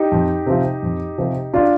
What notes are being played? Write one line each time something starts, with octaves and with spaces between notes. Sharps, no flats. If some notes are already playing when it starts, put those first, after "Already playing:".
Already playing: D#4 G4
F2
C3 F3
F2
C3 F3
D4 F4